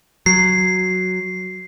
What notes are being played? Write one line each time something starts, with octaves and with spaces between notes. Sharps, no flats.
F#3 C7